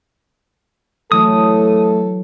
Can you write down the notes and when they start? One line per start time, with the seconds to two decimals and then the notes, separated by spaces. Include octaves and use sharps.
1.12 E3 F#3 A3 E4 A4 D#6